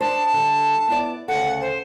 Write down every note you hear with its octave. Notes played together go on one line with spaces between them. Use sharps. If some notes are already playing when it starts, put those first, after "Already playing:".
D4 C5 A5
D3 G3
B3 E4 D5
D2 C#3 A4 F#5
C5